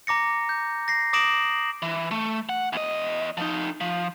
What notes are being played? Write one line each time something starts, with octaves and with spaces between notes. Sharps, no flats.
A#5 D6 A#6 C#7
G6
A#6 C7
D6 D#6 A#6 D7 E7 F#7
E3
A3
F#5
E2 D#5
F3 D#4
F3